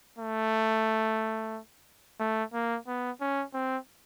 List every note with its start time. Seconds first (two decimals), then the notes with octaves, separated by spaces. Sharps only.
0.19 A3
2.20 A3
2.53 A#3
2.87 B3
3.21 C#4
3.54 C4